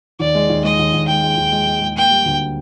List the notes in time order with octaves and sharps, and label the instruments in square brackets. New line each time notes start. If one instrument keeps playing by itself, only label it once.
[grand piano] D#2 [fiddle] D5
[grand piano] G#3
D#2
[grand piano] G#3 [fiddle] D#5
[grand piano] D#2
D#2
[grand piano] G#3 [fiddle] G5
[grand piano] G#3
D#2
G#3
G#3
G#3
[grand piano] A#3 [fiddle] G5
[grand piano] G3
D2